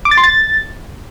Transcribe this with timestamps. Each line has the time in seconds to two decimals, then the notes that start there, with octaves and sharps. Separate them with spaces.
0.05 D6
0.11 A6
0.17 C6
0.24 A6